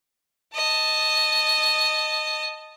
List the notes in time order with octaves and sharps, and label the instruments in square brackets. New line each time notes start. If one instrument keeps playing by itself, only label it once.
[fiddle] D#5 A5